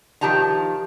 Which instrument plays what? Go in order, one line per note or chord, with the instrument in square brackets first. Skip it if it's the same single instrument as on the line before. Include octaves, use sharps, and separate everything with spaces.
[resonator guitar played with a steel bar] D#3 F3 G4 A5 A#5